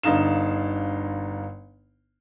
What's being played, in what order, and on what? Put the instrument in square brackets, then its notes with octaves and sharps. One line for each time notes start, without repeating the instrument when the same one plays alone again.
[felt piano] G1 D3 D#4 F5 E7